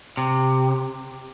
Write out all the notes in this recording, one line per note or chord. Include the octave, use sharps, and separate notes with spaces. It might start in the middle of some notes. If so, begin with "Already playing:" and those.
C3